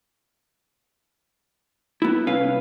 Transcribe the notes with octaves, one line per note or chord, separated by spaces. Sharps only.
B3 E4
C2 C#4 B4 F5